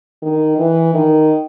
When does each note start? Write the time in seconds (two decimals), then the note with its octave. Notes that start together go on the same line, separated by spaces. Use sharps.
0.22 D#3
0.58 E3
0.94 D#3